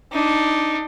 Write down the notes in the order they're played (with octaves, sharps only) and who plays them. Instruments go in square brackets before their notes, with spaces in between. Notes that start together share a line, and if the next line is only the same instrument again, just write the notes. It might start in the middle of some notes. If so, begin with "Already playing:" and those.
[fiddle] D4 D#4